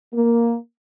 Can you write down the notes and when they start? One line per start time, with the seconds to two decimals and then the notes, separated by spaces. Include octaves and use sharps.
0.13 A#3